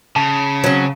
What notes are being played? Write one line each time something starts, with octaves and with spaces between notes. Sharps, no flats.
C#3 A5
F#3 C#4